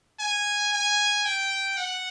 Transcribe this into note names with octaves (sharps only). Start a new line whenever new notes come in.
G#5
G#5
G5
F#5